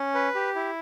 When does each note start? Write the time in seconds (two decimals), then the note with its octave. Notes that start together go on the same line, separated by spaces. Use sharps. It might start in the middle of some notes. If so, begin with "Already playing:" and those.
Already playing: C#4
0.15 B4
0.35 G4
0.55 E4